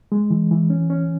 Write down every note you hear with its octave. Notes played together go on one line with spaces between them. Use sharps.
G#3
E3
E3
C#4
C#4